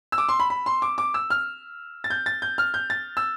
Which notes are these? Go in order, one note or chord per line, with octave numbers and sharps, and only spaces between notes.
E6
D6
C6
B5
B5
C6
D6
D6
E6
F6
A6
G6
A6
G6
F6
G6
A6
E6